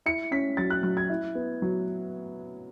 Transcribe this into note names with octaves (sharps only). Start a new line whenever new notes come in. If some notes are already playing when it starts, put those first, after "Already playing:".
E4 C#7
C#4 B6
F#3 A6
F#6
F#3 F#6
G#6
E4
B3
F#3